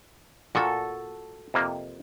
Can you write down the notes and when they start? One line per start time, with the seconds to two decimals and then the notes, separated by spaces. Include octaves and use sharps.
0.55 A#2 F#4 A4
1.54 F2 C3 A#3